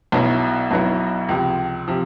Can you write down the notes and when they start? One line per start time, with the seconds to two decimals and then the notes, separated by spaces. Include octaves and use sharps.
0.12 B1 B2 F#3 B3 E4
0.71 B1 B2 F#3 B3 E4
1.29 C#2 C3 F3
1.88 C3 F3